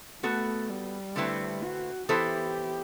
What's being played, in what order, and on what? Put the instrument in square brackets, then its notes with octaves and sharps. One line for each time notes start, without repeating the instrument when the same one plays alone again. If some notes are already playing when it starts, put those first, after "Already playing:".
[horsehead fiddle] A3 [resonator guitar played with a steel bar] B3 F#4 A4
[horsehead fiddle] G3
[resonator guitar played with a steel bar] D3 A3 C4 E4 B4
[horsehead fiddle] F#4
[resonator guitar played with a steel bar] E3 B3 E4 A4 C5 [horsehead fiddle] G4